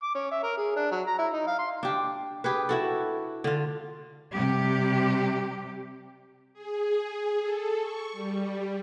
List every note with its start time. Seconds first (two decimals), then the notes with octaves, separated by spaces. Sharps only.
0.03 D6
0.15 C#4
0.32 E5
0.43 A#4
0.57 G#4
0.76 D4
0.91 F#3
1.07 A#5
1.19 E4
1.33 D#4
1.47 F5
1.59 C6
1.83 D4 G4
2.44 G4 G#4 B4
2.69 E4 F#4 A4
3.44 D3 F4
4.33 C3 G3 G4
6.54 G#4
7.41 A4
7.79 C#6
8.13 G3